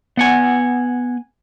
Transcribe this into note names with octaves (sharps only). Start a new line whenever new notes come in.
B3 F#5 G#5